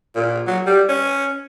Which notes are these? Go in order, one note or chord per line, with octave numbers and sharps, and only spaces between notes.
A#2
F#3
G3
C#4